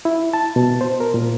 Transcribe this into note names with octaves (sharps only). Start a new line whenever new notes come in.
E4
A5
B2
C5
A#4
A#2